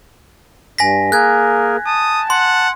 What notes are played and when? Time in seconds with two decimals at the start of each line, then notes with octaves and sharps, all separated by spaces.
0.78 G2 G#5 A#6 B6
1.12 A#3 G#4 A#4 F#6 G#6
1.86 A5 D#6
2.30 F#5 C6